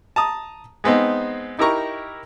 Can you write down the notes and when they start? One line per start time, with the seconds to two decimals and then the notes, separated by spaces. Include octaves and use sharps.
0.16 A5 A#5 D#6
0.84 G#3 B3 C4 D#4
1.59 D#4 E4 G4 A#4 A#5 C#6